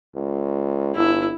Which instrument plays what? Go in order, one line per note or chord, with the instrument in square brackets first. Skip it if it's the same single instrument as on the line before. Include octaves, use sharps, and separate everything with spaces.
[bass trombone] C#2
[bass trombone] G1 [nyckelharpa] E4